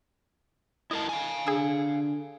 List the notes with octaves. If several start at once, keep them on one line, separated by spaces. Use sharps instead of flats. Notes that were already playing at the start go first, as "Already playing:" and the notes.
E4 A#4 D#5 A5
F5 G#5
D3 G#4 E6